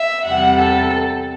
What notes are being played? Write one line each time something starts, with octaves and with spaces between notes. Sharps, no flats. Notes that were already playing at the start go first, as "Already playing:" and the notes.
Already playing: E5
E2 C3 G3 F#5
A4